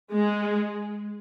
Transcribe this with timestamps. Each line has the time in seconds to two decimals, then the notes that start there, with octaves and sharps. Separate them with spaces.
0.12 G#3